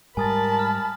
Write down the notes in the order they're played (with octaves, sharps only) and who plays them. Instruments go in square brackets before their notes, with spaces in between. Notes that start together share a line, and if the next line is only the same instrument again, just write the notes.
[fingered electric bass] G#2 G3 [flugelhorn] A#4 [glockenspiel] G#5 D#6 A6 [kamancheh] A5 B5
[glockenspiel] F6